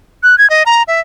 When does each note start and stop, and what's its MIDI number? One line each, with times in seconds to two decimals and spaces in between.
0.23 0.38 90
0.38 0.49 92
0.50 0.63 75
0.66 0.83 82
0.88 1.00 76